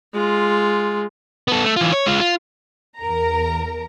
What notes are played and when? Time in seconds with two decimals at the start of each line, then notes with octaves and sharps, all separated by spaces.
0.13 G#3 F4
1.48 B3 A4
1.64 A3
1.76 E3 F4
1.93 C#5
2.06 G#3 F4
2.20 F4
3.00 E2 A#4 A#5